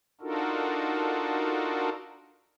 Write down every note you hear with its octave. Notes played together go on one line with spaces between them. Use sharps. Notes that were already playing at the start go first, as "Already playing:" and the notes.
D4 D#4 F4 F#4 A4 A#4